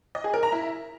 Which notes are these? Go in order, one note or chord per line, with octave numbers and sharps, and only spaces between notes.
D#5
G#4
A#4
A#5
E4